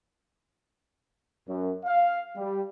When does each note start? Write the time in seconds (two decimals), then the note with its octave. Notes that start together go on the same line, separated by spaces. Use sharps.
1.47 F#2
1.84 F5
2.36 G3